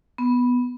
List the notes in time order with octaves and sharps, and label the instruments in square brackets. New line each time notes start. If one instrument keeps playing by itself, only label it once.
[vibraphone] B3